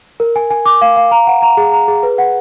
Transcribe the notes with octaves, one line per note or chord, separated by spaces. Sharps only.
A#4
G#5
G#5
D6
F5
F5
A#5
F#5
A#5
G#4
A#5
G#4
B4
F#5